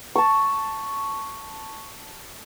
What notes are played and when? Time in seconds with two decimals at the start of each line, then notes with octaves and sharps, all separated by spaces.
0.16 A5 C#6